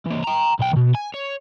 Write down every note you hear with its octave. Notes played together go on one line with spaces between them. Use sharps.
E3 A#3
G5 A#5
B1 G5
B2 D#3
G#5
C#5